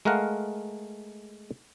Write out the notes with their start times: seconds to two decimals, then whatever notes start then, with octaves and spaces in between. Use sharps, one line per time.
0.05 G#3 A3 A#4 F5 F#5